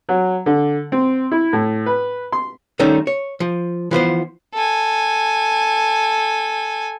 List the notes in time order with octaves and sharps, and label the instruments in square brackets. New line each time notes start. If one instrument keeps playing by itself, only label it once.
[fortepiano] F#3
D3
C4
E4
A2
B4
C6
[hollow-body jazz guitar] D#3 G3 A3 C#4 D#4
C#5
F3
E3 F3 B3 C5
[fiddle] A4 G#5